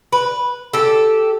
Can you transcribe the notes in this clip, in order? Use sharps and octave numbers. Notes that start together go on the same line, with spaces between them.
B4
G4 A4